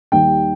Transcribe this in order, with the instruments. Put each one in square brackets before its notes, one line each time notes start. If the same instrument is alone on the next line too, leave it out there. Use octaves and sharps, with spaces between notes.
[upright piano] D#2 D#3 G3 G5